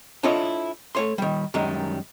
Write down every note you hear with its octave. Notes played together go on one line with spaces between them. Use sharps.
D4 E4 F4 A4 C#5 D#5
A3 C#5 C6
D#3 G3
F#2 D#3 G3 G#3